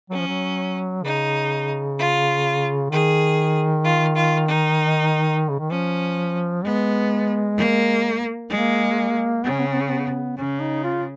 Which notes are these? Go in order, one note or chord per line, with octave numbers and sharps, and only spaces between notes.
F#3 C#4
F3
F#3
C#3 D#4
F4
D#3 G#4
F4
F4
D#4
C#3
D#3
F3 C#4
G#3 B3
A#3
G#3 A#3
C#3 B3
C#4
B3
C#4
B3
C#4
B3
C#3 C#4
D#4
F4